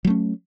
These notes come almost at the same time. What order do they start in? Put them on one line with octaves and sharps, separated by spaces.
F#3 A3 C#4